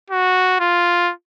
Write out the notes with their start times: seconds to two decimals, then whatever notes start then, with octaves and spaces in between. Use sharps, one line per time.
0.10 F#4
0.60 F4